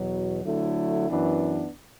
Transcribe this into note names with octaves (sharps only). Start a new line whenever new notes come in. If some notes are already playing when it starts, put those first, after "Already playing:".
Already playing: E2 B2 F#3
D3 F#3 A3 E4
F#2 E3 B3 D4